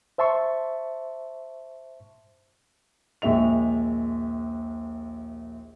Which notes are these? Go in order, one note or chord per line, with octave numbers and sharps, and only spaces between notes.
C5 E5 A5 C6 C#6
A#1 D#2 G#3 E5 F7